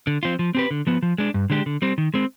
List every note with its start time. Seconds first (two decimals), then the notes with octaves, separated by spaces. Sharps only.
0.07 D3
0.23 F3 C4 F4
0.39 F3
0.55 C4 G4 B4
0.71 D3
0.87 F3 B3
1.03 F3
1.18 G#3 D4
1.34 G2
1.50 D3 G#3 D4 G4
1.66 D3
1.82 G3 C4
1.98 D#3
2.14 G#3 C4